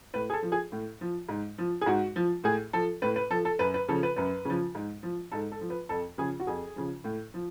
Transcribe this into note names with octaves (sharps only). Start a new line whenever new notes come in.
A2 B4
G#4
A4
F3
G#4
A2
F3
G#2
F3
G#4
G#2 F#4
F3
A2 G#4
F3 A4
A2 B4
B4
F3 A4
A4
F#2 B4
B4
C#3 F3 A4
B4
F#2 B4
C#3 F3
G#2
F3
G#2 A4
A4
F3
B4
F2 A4
C#3 F3 G#4
F#4
F2 G#4
C#3 F3
A2
F3